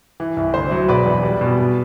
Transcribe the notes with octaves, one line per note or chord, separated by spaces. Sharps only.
E3
C2
D2 C5
F#3
E1 B4 D5
E2
G3
B2
B2